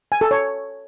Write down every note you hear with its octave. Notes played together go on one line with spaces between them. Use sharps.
G#5
A4
C#5